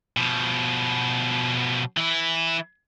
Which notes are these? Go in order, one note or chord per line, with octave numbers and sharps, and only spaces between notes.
B2 F3
E3 E4